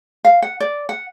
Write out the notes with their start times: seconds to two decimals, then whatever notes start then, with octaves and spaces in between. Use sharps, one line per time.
0.25 F5
0.42 F#5
0.60 D5
0.89 F#5